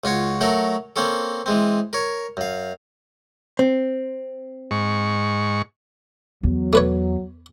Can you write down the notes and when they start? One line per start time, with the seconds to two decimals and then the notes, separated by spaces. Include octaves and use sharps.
0.04 C#2 F4 F#4 C#5
0.41 F#3 A3 F#4 A4 A#4
0.96 A#3 C4 C#4 A4
1.46 E3 G#3 C4
1.93 A#4 C#5
2.37 F#2 F5
3.59 C4
4.71 G#2 C#6
6.43 E2 F#3
6.73 A3 B4 C#5